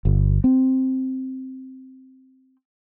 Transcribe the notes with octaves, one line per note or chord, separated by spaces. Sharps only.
G1
C4